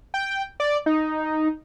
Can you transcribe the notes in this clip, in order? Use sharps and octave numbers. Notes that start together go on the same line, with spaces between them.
G5
D5
D#4